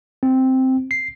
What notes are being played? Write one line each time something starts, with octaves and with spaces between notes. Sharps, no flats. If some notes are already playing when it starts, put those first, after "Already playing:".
C4
C7